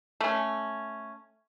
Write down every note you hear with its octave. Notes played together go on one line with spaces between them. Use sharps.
A3 C#4